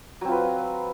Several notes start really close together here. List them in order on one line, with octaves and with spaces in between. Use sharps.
F#3 C4 F4 B4